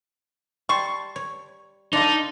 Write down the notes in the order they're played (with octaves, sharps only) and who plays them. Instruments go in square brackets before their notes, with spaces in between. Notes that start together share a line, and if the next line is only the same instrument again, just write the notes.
[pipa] G3 C6 C#6 [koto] A5
[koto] C#5
[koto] D4 F4 A4 [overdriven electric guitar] D#4